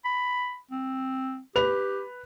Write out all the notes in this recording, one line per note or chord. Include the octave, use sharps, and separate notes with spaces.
B5
C4
G4 B4 F7